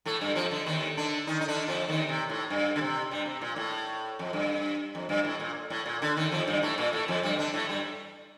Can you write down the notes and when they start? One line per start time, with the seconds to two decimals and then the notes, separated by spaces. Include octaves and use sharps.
0.05 A2 A3
0.21 G2 G3
0.35 F2 F3
0.51 D3
0.66 D#2 D#3
0.97 D3 D4
1.27 D#3 D#4
1.41 D#4
1.48 D3 D4
1.68 F2 F3
1.88 D#2 D#3
2.09 C3
2.30 A2
2.50 G2
2.76 D3
2.81 C3
3.11 G2 G3
3.26 C3
3.41 A#2
3.56 A2
4.19 F2
4.33 G2
4.95 F2
5.09 G2
5.25 A2
5.40 A#2
5.70 A2
5.86 A#2
6.02 D3
6.16 D#2 D#3
6.32 F2 F3
6.47 G2 G3
6.63 A2 A3
6.78 A#2 A#3
6.93 A2 A3
7.08 F2 F3
7.23 G2 G3
7.39 D3 D4
7.54 A2 A3
7.69 G2 G3